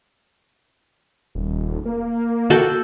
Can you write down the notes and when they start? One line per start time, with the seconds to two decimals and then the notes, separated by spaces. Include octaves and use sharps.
1.35 D#1
1.86 A#3
2.50 F#4 A4 G5